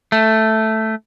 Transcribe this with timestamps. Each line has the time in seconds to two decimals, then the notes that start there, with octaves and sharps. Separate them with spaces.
0.12 A3